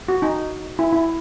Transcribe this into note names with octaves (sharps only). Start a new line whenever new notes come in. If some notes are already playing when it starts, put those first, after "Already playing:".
F#4
D#4
E4
E4